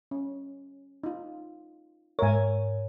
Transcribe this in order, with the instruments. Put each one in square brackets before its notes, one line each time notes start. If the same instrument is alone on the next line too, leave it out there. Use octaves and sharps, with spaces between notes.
[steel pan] C#4
D#4 F4
[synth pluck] G#2 C#5 [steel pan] A#4 E5 G#5